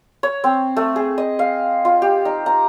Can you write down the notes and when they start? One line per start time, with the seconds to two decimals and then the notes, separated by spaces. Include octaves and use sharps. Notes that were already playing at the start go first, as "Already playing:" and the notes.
0.23 C#5
0.44 C4
0.76 A3
0.96 G#4
1.18 D#5
1.39 F5
1.85 F4
2.02 G4
2.25 D#4
2.46 A#5